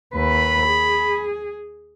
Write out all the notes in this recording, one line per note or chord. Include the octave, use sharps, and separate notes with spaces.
D#2 B4 B5
G#4